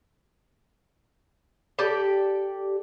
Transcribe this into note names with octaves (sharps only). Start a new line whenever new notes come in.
G4 A4 D5